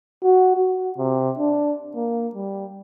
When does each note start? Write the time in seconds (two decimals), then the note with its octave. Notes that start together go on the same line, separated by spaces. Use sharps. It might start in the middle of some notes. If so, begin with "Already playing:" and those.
0.24 F#4
0.57 F#4
0.98 C3
1.39 D4
1.95 A#3
2.35 G3